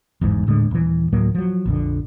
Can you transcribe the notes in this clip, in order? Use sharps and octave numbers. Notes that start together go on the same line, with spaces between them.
G1 E2 G#2
D#1 A2 D3 G#3
D#1 E3
D2 A2 F#3 A#3
F3 F#3
A#1 F2 D3